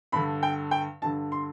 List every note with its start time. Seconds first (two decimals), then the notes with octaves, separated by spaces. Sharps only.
0.12 G2 D3 B5
0.43 G5
0.71 G5
1.02 G2 D3 A5
1.32 C6